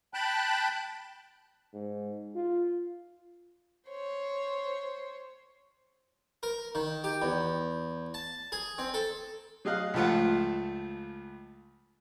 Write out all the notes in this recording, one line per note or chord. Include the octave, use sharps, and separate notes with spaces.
G5 A5 B5 F#6
G#2
F4
C5 C#5
A#4
D#3
G4
E2
A5
G#4
C4
A4
F#3 G#4 D#5 F5 F#6
C#2 F3 A3 F4 F#5